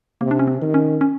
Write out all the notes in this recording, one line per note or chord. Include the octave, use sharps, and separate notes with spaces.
C3 A#3
D4
C#4
C4
D#3
C#4
C#4